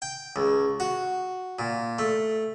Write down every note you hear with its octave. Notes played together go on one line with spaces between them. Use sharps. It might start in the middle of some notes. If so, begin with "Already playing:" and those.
G5
C#2
F#4
A#2
A3